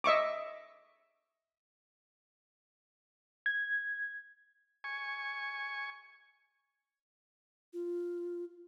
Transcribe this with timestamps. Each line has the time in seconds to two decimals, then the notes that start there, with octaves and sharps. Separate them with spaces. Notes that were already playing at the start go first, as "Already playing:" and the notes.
0.04 D#5 E5 C#6 D6
3.46 G#6
4.84 G#5 C#6
7.73 F4